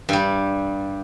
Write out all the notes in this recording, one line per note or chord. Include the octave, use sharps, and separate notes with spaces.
G2 G3